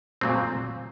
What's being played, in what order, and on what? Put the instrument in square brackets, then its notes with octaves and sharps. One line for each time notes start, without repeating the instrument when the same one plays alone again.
[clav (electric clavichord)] A#2 F#3 A3 C4